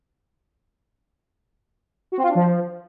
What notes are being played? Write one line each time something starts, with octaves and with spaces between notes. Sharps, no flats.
F#4
C4
F4
D4
F3